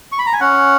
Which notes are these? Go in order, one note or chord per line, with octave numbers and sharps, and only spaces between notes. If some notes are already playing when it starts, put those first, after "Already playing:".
C#6
B5
A#5
G#5
C#4 F#5